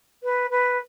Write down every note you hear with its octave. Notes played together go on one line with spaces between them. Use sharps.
B4
B4